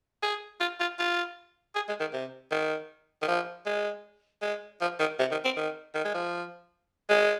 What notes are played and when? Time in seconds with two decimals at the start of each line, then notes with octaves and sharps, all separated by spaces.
0.23 G#4
0.60 F4
0.80 F4
0.99 F4
1.75 G#4
1.89 G#3
2.00 D#3
2.13 C3
2.51 D#3
3.22 D#3
3.28 F3
3.66 G#3
4.42 G#3
4.81 F3
5.00 D#3
5.19 C3
5.31 D#3
5.45 C4
5.57 D#3
5.95 D#3
6.05 G#3
6.14 F3
7.09 G#3